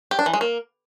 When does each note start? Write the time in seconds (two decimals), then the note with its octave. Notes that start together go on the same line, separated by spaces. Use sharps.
0.11 G4
0.19 D4
0.26 E3
0.33 G#3
0.41 A#3